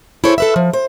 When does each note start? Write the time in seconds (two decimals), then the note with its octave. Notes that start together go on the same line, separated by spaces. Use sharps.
0.24 E4 G#4 A4 C5 C#5
0.38 A4 B4 E5
0.56 F3
0.73 C5